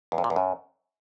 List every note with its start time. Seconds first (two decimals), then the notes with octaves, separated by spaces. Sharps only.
0.12 E2
0.18 F2
0.24 A#2
0.30 E2
0.36 F#2